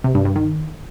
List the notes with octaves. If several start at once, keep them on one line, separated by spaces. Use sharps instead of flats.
C3
G2
G2
D#3